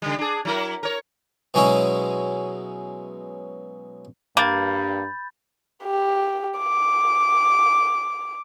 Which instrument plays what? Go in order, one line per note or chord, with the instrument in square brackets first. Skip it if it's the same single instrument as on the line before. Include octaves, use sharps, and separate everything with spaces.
[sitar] C#3 G3
D4 G#4
F#3 E4 A#4
A#4 C#5
[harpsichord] B2 F#3 G#3 C#4 E4 D#6
[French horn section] G2 [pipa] A#3 [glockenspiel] B5 G6 A6
[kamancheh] G4
D6